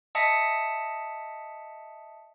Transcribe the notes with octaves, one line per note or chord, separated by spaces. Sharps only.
D#5 E5 A5 D#6 B6 C#7